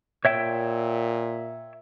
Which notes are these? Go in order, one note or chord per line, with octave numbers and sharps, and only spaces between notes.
A#2 C#5 E5 G5